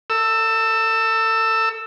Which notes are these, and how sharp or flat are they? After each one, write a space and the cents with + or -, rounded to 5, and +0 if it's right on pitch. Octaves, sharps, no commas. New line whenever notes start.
A4 +35 E6 +0